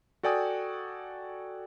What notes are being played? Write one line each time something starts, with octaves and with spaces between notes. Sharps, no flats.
F#4 A4 D5 G5 G#5 D#6